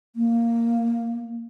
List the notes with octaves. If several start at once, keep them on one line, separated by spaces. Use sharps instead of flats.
A#3